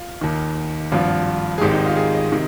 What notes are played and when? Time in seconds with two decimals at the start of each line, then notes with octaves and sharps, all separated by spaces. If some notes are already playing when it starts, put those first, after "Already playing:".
Already playing: F4
0.21 D#2 D#3
0.92 G#1 G2 F3 F4
1.58 G#4
1.61 G#1 G#2 D#3 G4
1.73 D#4
1.86 F4
1.96 G#4
2.15 D#5
2.32 C3 D#3